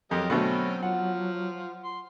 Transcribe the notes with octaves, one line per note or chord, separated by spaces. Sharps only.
F2 F#3 G4 A#4 D#5
B2 D3 A3 C4 C#4
F3 F#5
C6